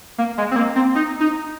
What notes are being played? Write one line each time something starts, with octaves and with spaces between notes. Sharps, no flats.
A#3
G#3
C4
A#3
C4
D#4
D#4